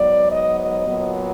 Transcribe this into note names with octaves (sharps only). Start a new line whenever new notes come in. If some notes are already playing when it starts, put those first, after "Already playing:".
Already playing: G#2 F#3 B3 D5
D#5
D#5
A#2 F#3 B3